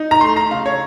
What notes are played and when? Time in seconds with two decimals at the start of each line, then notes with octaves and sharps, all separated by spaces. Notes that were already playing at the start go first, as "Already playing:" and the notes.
Already playing: D#4
0.11 A#5
0.21 A3 C6
0.36 A#5
0.51 C#3 F5
0.66 C#5